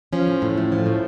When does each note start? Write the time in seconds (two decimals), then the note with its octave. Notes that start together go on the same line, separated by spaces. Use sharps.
0.13 F3 C#4
0.27 A2
0.42 A2
0.57 A3
0.72 F3
0.86 A2